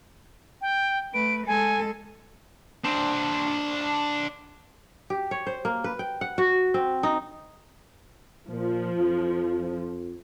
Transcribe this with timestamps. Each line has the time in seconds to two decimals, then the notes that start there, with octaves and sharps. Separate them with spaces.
0.61 G5
1.14 A3 B4 D7
1.47 G#3 A4 G#5
2.84 D4 C5
5.10 G4
5.31 C#5
5.47 C5
5.65 A#3
5.84 B4
5.99 G5
6.21 F#5
6.38 F#4
6.74 C4
7.03 D#4
8.49 A#2 F3
8.97 F2